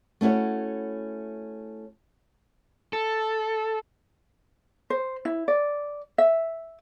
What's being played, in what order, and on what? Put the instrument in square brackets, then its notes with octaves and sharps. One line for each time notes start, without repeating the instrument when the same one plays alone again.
[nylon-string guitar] A3 C#4 E4 F#4 C#5
[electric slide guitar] A4
[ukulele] C5
E4
D5
E5